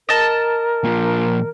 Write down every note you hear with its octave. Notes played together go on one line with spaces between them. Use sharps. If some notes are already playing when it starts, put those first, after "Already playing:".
A#4 D#5 A5
A#2 F3